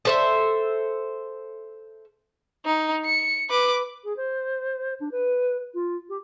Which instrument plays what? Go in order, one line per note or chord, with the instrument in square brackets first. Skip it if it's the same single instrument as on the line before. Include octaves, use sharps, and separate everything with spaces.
[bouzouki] A4 C5 E5
[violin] D#4
C#7
B4 D6
[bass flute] G#4
C5
D4
B4
F4
G4